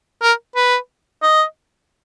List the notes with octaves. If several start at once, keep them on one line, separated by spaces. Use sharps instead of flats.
A#4
B4
D#5